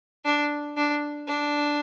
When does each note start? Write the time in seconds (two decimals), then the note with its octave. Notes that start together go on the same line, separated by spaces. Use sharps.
0.25 D4
0.77 D4
1.28 D4